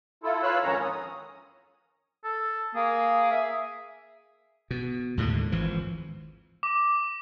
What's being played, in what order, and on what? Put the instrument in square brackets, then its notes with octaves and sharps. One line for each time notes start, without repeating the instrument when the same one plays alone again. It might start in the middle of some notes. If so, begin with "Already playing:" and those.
[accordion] E4 F4 A4
F4 B4 C#5 F5 E6 F#6
F2 G#2 D#3 C#4 C#5 A#5
D#6
[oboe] A4
[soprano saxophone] A#3 [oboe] G#4
[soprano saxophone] E5
[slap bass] B2
D#2 A2 D3 G#3
G#1 E3 F3
[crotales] D6